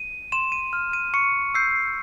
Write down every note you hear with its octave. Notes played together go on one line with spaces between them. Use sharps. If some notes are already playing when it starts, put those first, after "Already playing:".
Already playing: D#7
C6 E7
D#7
F6
D#7
C#6 C#7
E6 G6 C7